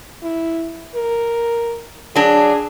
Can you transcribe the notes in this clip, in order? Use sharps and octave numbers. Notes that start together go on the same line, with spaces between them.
E4
A#4
F#3 D4 G#4